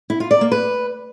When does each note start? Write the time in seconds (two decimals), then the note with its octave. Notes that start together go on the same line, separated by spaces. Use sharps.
0.10 E4
0.20 F4
0.31 D5
0.41 A#3
0.52 B4